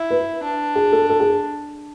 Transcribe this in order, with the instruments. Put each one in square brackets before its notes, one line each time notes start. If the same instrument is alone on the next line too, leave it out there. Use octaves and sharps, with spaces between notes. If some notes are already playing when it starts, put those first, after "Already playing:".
Already playing: [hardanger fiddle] E4
[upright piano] B4
[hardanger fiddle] D4
[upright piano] G#4
A4
A4
G#4